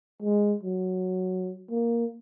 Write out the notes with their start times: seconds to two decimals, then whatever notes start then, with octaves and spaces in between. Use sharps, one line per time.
0.22 G#3
0.63 F#3
1.70 A#3